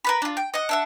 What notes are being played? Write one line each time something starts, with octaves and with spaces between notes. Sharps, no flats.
A#4 B4 B5
D4 F4
G5
D#5 F#5
D4 E5 F#5